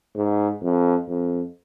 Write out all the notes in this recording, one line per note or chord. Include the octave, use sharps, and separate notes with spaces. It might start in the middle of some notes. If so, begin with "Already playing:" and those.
G#2
F2
F2